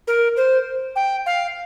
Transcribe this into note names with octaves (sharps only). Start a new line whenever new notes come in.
A#4
C5
G5
F5